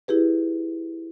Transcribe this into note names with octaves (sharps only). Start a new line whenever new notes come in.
E4 G4 G#4 B4